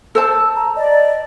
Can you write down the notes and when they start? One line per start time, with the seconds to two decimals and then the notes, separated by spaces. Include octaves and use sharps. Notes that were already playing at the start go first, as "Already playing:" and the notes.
0.15 A4 C5 A5 E6
0.56 A#5
0.76 D5 D#5